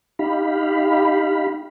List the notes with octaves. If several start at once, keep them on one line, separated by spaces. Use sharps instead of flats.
D#4 G4 F5 B5